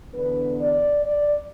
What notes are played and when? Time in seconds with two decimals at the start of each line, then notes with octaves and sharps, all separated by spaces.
0.12 E2 D3 B3 D4 B4
0.59 D5
1.04 D5